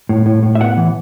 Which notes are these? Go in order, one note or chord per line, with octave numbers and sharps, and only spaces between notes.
A2
A2
A2
E5
B3 F#5
E3